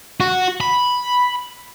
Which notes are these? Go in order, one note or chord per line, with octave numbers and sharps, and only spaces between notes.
F#4
B5